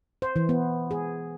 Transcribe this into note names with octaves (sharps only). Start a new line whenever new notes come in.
C5
E3
B3
G#4